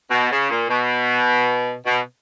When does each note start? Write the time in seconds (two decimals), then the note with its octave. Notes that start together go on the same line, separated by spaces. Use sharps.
0.11 B2
0.31 C#3
0.50 A#2
0.69 B2
1.85 B2